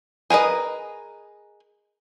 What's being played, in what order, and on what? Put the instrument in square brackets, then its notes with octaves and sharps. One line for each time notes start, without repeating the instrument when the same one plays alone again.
[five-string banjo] G#4 A#4 B4 D#5